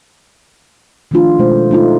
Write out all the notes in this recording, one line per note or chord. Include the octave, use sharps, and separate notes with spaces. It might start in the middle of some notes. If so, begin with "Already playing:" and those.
D#3 F3 A3 D4 F4
B2 G#3 A3 C5
A3 D#4 F4